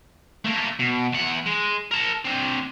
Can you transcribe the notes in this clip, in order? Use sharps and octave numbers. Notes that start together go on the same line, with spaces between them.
A3 A#3
B2
E2 F#5
G#3
A#4 A5
C4 D4